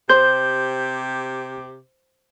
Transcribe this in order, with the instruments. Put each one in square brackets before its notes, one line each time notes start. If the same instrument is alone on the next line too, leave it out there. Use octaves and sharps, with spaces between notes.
[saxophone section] C3 G4 [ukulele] C5 [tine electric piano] G6